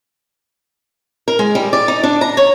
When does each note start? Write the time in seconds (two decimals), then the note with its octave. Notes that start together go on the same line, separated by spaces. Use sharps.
1.28 A#4
1.39 G#3
1.55 G3
1.73 D5
1.88 D#4
2.03 D4
2.21 A#5
2.37 C#5